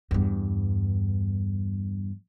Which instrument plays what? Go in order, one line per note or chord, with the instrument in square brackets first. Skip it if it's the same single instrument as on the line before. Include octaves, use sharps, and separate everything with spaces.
[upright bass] E2 G2